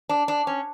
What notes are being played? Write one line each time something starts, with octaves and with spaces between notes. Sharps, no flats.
D4
D4
C#4